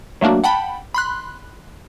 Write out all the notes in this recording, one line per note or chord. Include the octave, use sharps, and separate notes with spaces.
F#3 A3 A#3 D4 F#4
F#5 G5 A5 B5
B5 C6 F#6